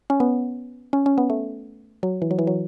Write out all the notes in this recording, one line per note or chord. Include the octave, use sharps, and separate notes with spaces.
C#4
B3
C#4
C#4
B3
A3
F#3
E3
F#3
E3
F#3